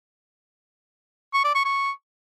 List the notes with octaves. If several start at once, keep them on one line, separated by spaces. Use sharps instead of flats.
C#6
D5
C#6
C#6